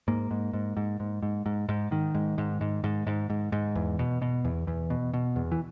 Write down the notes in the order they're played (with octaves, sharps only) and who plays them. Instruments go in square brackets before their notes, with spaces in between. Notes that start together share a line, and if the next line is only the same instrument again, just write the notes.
[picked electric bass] G#2 A#3
G#2
G#2
G#2
G#2
G#2
G#2
G#2
G#2 D#3
G#2
G#2
G#2
G#2
G#2
G#2
G#2
E2
B2
B2
E2
E2
B2
B2
E2
E3